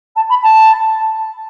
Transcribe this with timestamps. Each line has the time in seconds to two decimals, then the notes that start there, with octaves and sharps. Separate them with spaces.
0.16 A5
0.29 B5
0.43 A5